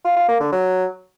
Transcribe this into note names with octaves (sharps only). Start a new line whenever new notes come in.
F4
F4
A#3
D3
F#3